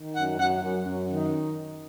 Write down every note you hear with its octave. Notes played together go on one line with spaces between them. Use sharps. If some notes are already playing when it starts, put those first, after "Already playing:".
Already playing: D#3
F#2 F#5
F#2 F#5
F#2
F#2
D#3